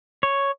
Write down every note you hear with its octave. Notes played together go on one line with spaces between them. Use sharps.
C#5